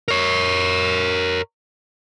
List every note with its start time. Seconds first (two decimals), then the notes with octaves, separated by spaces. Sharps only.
0.08 A#4 C#5